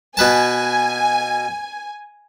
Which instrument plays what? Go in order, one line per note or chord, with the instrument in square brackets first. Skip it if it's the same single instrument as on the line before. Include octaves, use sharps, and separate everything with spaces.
[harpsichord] B2 B4 A5 [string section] G#5